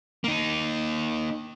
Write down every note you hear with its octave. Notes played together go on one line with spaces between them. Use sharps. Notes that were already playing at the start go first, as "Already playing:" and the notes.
A#3 D#4